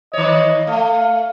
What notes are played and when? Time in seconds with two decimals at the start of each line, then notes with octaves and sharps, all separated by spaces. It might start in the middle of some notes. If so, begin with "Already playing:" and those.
0.13 D#3 C#5 D#5
0.67 A3 F5